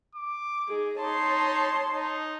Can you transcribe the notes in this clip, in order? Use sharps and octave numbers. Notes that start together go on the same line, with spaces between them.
D6
D#4 G#4
D#4 C#5 A5 C6
D#4